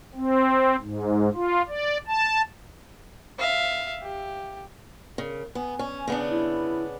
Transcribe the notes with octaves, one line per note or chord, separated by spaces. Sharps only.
C4
G#2
F4
D5
A5
E5 F5
G4
C#3 A#4
B3 G#5
C#4
C#3 B3 D4
E4